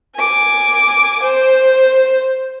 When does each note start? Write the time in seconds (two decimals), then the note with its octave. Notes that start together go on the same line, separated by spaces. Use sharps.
0.16 G#5 D6
1.22 C5